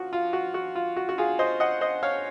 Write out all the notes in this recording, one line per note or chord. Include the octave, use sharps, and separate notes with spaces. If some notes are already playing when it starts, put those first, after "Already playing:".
Already playing: F3 F#4
F4
F#4
F#4
F4
F#4
F#4
F4 G#4
C5 D#5
D#5 F#5
C5 D#5
C#5 F5